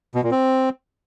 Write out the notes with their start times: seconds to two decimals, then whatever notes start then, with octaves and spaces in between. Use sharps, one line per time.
0.15 B2
0.23 A#2
0.31 C4